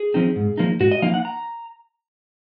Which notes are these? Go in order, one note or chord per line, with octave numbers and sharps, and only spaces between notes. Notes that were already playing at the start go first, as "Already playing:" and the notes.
Already playing: G#4
F3 C4 D#4
G#2
F3 A#3 D#4
G#2 F#4
D#5
F3 A#3 D#4 F5
F#5
A#5